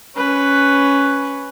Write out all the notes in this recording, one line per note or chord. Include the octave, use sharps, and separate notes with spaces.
C#4 B4